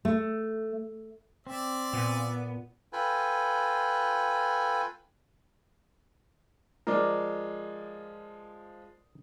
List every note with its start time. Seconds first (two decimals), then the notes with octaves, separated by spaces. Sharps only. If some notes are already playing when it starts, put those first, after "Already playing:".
0.05 A3
1.47 C4 D5 E5
1.93 A#2 B3
2.93 F4 A4 B4 G5 G#5
6.87 F3 G#3 A#4 D5